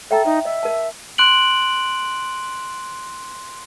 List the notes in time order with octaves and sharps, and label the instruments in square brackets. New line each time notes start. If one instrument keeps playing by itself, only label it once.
[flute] A4 [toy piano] E5 G5 A#5
[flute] D#4 [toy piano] E5
[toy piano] D#5 [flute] E5
[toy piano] A#4 A5
[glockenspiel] C6 F#6 D7 F#7